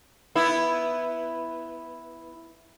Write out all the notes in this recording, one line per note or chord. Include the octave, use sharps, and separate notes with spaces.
B3 E4